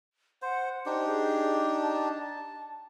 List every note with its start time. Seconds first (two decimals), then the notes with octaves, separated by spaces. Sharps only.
0.42 C5 F#5
0.86 D4 D#4 G4 C5
1.07 G#4
1.82 A5